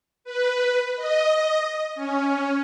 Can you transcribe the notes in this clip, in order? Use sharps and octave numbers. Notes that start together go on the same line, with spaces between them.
B4
D#5
C#4